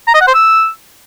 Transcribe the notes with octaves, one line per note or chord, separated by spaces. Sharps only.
A#5
D#5
F#5
C5
E6